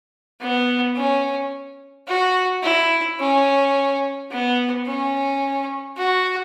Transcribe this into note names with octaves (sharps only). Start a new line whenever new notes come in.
B3
C#4
F#4
E4
C#4
B3
C#4
F#4